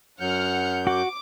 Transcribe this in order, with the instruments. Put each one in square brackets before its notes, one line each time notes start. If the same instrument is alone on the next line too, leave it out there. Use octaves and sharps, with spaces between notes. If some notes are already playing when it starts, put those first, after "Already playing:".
[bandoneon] F#2 F#3 G6 [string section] F#5 F6 C#7
[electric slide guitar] F#4 [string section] D6